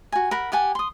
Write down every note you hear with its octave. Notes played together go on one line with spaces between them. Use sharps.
F#4 G#5
A#4 F#5 B5
G4 F#5 G#5 A5
C6 D#6